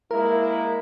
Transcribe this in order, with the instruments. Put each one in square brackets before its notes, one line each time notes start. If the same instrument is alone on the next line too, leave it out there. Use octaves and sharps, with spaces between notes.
[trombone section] G#3 A#3 E4 [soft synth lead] A#4